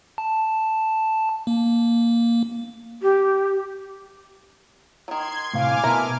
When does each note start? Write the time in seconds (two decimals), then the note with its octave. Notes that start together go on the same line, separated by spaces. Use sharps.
0.18 A5
1.47 A#3
3.02 G4
5.08 D#3 F#3 C6 G#6
5.53 A2 C3 F5 G#5 D6 F6
5.84 B2 A3 E4 A#4 A#5